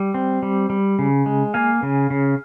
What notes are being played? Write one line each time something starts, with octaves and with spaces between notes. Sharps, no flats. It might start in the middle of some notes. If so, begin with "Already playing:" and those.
Already playing: G3
C4
G3
G3
C#3
G#3
A#3 F5 G#5
C#3
C#3